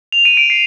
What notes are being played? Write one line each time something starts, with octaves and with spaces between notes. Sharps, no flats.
F7
D#7
D7
C7